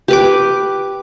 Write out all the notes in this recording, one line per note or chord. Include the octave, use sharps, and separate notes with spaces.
G4 B4 D6